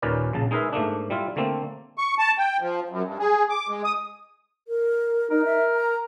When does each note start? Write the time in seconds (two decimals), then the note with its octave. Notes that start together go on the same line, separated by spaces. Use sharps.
0.02 D#2 A#2 C#4 A#4 B4 D5
0.33 A#1 C#3 A5
0.51 G#3 D#4 G#4 A#4 B4 E5
0.72 G#2 A3 A#3 D4
1.10 G3 E4 F4
1.36 D3 A3 A#3 C4
1.97 C#6
2.19 A5
2.38 G5
2.60 F3
2.89 F#2
3.05 G2
3.19 G#4
3.50 D6
3.69 G#3
3.84 D#6
4.68 A#4
5.30 D#4 A#4
5.45 E5
5.75 A#5